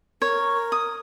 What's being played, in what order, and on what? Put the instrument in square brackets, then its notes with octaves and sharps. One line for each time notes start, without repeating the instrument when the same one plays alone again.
[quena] A#4 [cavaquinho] C#5
[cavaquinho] D#6